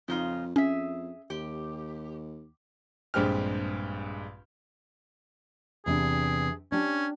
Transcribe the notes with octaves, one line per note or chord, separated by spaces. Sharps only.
F2 C#3 D#4 F4
F2 C#4 G#4 E5
D#2 G4
A#1 G2 G#3 C4 G4 F6
E2 C3 D4 G#4
C#4 D4 G4